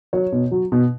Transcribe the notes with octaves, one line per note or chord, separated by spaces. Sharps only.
F#3 C#5
B2
F#3
B2